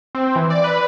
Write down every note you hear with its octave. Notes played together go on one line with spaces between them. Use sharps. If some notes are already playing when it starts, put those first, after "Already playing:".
C4
E3
D5
B4